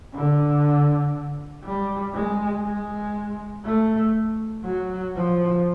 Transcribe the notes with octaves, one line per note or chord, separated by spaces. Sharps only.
D3
G3
G#3
G#3
A3
F#3
F3